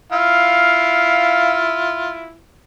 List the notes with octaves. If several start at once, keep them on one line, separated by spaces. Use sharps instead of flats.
E4 F4 F5